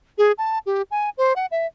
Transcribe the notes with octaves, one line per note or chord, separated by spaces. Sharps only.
G#4
A5
G4
G#5
C5
F#5
E5